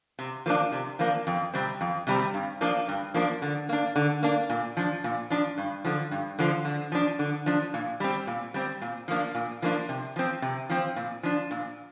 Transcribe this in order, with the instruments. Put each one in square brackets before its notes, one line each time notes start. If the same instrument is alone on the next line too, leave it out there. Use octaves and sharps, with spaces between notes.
[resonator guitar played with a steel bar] C3
F3 A#3 D4
C3
F3 A#3 D4
F2
C3 G3 C4
F2
C3 G3 C4
G2
F3 A#3 D4
G2
F3 A#3 D4
D3
A#3 D4
D3
A#3 D4
A#2
F3 D4
A#2
F3 D4
G2
D3 F3
G2
D3 F3
D3
F3 D4
D3
F3 D4
A#2
G3 C4
A#2
G3 C4
A#2
F3 A#3 D4
A#2
F3 A#3 D4
C3
F3 C4
C3
F3 C4
A#2
F3 D4
A#2